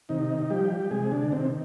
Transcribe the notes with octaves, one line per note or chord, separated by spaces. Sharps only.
C3 D#3 D#4
F3 G3 G4
G4
C3 G#3 G#4
D3 D4
C3 D#3 C4